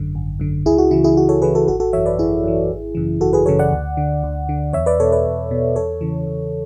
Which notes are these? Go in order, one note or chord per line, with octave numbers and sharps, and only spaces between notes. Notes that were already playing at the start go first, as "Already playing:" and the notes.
Already playing: G#1 F#2 D3
G#1
F#2 D3
C#2 E4 G#4
F#4
C#3 E3 E4
E4 G#4
C#2 F#4
A4 C#5
C#3 E3 G#4 B4
F#4 A4
G#1 F#4 A4
F#4 A4
F#2 E3 C#5 E5
B4 D5
G#1 E4 G#4
F#2 E3
G#1
F#2 C#3 E3
G#1 F#4 A4
G#4 B4
F#2 C#3 E3 A4 C#5
D5 F#5
D2
D3
D2
D3
E2 C#5 E5
B4 D5
B2 A4 C#5
B4 D5
E2
B2
E2 A4 C#5
C#3 E3
E2